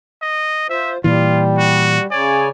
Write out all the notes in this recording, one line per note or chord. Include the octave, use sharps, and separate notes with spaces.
D#5
F4 C5 E5
A#2 E3 G3 F4
F#4
C#3 C#5 D5 G#5